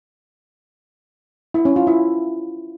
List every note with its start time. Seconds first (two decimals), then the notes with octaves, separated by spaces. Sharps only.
1.54 E4
1.65 C#4
1.76 F4
1.87 E4